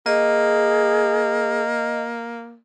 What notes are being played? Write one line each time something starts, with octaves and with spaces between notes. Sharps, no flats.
A#3 G#4 D#5